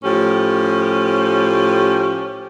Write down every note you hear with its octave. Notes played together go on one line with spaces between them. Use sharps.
A2 F3 C#4 G4